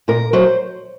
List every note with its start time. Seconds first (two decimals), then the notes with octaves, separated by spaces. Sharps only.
0.08 A#2 A#4
0.33 F#3 C5